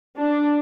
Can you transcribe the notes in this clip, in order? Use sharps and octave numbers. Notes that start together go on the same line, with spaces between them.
D4